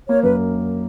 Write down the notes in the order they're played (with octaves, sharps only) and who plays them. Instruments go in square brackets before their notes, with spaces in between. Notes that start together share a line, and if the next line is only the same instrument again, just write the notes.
[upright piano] A#3 [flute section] C#5
[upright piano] F#2 [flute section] B4